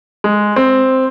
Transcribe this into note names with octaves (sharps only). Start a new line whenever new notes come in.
G#3
C4